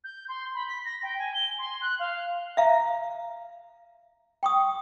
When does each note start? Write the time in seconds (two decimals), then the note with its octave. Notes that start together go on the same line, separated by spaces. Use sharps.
0.04 G6
0.28 C6
0.54 B5
0.68 B6
0.85 A#6
1.02 G5
1.18 G#5
1.34 G7
1.58 C6
1.81 F#6
1.99 F5
2.57 E5 F5 A#5
4.43 G5 C#6 D#6